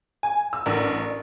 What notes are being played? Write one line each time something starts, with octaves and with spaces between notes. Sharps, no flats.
G#5
E6
A1 D4 A#4